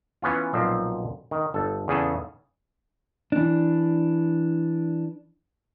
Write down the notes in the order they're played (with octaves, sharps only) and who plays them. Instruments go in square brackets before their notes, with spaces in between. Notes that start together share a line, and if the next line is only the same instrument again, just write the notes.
[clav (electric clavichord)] E3 B3 C#4 F4
B1 A#2 F3 C4 C5
D#3
G1 A4
E2 C#3 G#4 A4
[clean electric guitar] E3 D4